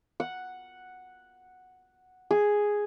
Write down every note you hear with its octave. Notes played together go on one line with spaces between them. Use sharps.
F#5
G#4